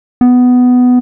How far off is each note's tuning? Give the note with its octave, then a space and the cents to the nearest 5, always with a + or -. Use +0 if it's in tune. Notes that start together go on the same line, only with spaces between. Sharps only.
B3 +10